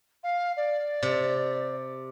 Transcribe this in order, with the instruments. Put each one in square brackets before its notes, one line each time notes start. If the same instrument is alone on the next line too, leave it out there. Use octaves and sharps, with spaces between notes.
[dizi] F5
D5
[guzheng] C3